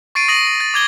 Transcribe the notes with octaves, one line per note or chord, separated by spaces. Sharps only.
C#6 A6 C7 D7 D#7
D#6 A#6 D#7 F#7
A#6
A6
D6 G#6 G7